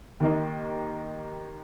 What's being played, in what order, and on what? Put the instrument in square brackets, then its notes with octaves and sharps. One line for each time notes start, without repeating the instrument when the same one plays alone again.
[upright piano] D#2 D#3 A#3 D#4